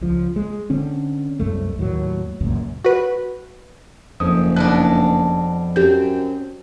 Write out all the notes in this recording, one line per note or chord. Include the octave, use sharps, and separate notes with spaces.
C#2 F3
G#3
D3 C4 C#4
C2 F#2 A3
D#2 A2 F3 F#3
C#2 F#2 A#2
F#4 B4
F#1 F2 D#6
B2 G#3 D4 F#6
F#2 C4 G4 G6